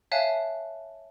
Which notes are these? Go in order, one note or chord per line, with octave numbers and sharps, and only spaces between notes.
C#5 E5 F5 G#5 A5 F#6